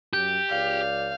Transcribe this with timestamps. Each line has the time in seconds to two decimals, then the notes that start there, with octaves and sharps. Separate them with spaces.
0.13 F#2 G4 G6
0.50 C#2 D5 F5